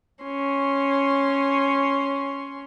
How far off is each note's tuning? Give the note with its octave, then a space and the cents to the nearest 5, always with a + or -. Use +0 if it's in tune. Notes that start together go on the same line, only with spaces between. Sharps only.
C#4 +0 C6 +5